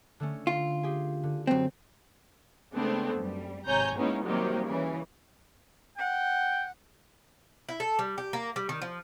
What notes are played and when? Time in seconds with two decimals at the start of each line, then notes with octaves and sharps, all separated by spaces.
0.20 D3 A3 C#4
0.47 F4
0.83 G4 G#4
1.23 D3
1.47 F#2 C4
2.73 C#3 G#3 A3 B3 C4 D4
3.16 F#2 G3
3.67 G#1 C3 C#5 G#5 A#5 G6
3.97 G#3 A#3 B3 C#4 D#4 E4
4.26 C3 D#3 F#3 G3 A#3 G4
4.66 C#3 E3
5.98 F#5 G5
7.69 E4
7.80 A4
7.99 G3
8.18 G4
8.33 A#3
8.56 G3
8.69 D#3
8.82 F3